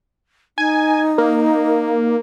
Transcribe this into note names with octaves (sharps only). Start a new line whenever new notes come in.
D#4 G#5
A#3